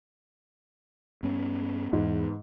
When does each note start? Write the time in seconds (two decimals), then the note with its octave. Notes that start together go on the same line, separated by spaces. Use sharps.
1.23 G2 B3 C#4
1.93 E2 G#2